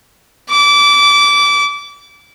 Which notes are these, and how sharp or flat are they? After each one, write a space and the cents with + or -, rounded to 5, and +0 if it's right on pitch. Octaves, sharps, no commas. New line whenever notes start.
D6 -25